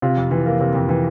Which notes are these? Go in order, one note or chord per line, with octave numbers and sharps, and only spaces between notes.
C3 F4
F2
E3
A#3
C3
F2
E3